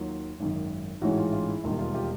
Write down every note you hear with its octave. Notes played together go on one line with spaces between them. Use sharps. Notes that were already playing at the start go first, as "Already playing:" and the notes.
Already playing: D#2 D#3 F#3 F4
G#1 F#2 D#3
A1 G#2 E3 G#3 C#4 E4 F#4
F4
F4
E4
E1 D#2 D#3 G3 F4
F4
F4 G4